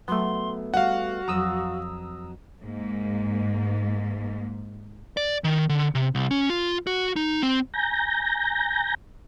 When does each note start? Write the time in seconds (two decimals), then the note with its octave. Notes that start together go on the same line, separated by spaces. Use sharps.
0.08 F#3 A3 B3 C6
0.74 G3 F#4 F5 F#5
1.28 F2 F#3 A#5 D#6 E6
2.62 G#2 A#3
5.17 D5
5.44 D#3
5.69 D3
5.95 C3
6.15 C2
6.31 C#4
6.50 F4
6.87 F#4
7.16 D#4
7.43 C4
7.74 G#5 A#5 G6 A#6